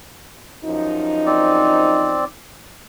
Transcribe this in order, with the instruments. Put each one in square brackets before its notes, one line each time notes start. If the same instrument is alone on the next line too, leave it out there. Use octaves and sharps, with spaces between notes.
[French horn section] F#2 F3 D#4
[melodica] C4 D5